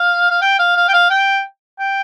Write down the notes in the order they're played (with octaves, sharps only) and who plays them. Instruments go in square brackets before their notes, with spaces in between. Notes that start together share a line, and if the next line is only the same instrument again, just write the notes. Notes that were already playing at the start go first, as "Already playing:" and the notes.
Already playing: [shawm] F5
F5
G5
F5
F5
G5
F5
G5
G5